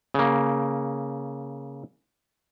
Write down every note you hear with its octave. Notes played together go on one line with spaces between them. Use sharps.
C#3 A#3